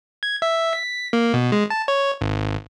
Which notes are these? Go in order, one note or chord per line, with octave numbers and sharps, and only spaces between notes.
G#6
E5
B6
A#3
B2
G#3
A5
C#5
G#1